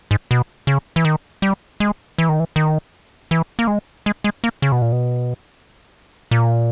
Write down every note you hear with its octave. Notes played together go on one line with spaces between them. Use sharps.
G#2
B2
C#3
E3
D#3
G3
G#3
E3
D#3
E3
D#3
E3
A#3
G#3
G#3
G#3
A#3
C#3
B2
A#2
B2
A#2